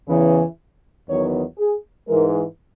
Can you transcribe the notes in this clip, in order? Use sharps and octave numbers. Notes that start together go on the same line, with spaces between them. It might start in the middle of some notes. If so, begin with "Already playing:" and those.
E2 C#3 E3
E2 D#3 F#3 B3 C#5
G#4
G#2 E3 G#3 A#4